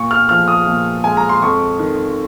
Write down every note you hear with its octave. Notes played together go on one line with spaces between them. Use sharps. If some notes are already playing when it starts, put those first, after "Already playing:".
Already playing: A#2 C#6
F6
F3 F6
D#6
A#2
G#3 G#5
A#5
C6
F2 C#6
D#3